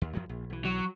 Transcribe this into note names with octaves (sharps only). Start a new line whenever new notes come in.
D#2
F#2 F3 F#3
A#1
B1 E3
F#3